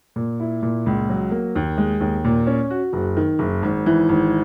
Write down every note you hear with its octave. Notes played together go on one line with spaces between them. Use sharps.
A#2
E4
A#2
C#2
F#3
A#3
D#2
G#3
D#2
A#2
C#4
F#4
F#1
D#3
F#1
G#1
E3
G#1